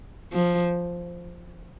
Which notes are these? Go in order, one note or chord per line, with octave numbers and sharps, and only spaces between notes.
F3